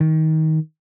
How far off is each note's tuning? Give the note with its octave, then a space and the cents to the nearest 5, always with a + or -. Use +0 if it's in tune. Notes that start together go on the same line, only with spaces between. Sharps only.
D#3 +20